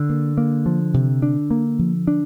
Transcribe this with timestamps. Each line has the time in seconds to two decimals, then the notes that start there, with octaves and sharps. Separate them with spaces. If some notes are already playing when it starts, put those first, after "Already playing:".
Already playing: D3
0.10 A#3
0.38 A#3
0.66 F3
0.94 C3
1.22 D4
1.51 A#3
1.79 F3
2.07 D4